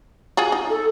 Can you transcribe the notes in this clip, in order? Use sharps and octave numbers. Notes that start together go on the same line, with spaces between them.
F4 F#4 G#4
D#4
A4